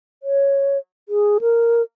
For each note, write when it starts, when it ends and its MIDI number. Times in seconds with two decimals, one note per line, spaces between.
0.23 0.78 73
1.09 1.38 68
1.41 1.82 70